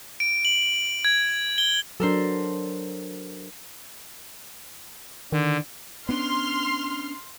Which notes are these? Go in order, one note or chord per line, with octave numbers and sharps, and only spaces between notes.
D7
F#7
G#6
G7
F#3 D4 A4 A#4 C5
D3 D#3
B3 C#4 D4 C6 F6